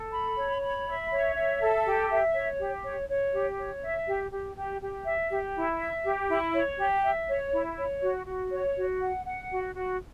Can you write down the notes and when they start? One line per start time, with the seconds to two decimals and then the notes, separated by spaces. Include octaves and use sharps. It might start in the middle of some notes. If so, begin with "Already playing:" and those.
Already playing: A4
0.13 B5
0.37 C#5
0.62 B5
0.87 E5
1.11 C#5
1.35 E5
1.60 A4
1.85 G4
2.10 E5
2.34 C#5
2.59 G4
2.83 C#5
3.09 C#5
3.33 G4
3.58 C#5
3.83 E5
4.07 G4
4.31 G4
4.56 G4
4.81 G4
5.05 E5
5.30 G4
5.56 E4
5.79 E5
6.05 G4
6.29 E4
6.54 C#5
6.78 G4
7.03 E5
7.28 C#5
7.52 E4
7.77 C#5
8.02 F#4
8.26 F#4
8.51 C#5
8.76 F#4
9.00 F#5
9.25 F#5
9.50 F#4
9.75 F#4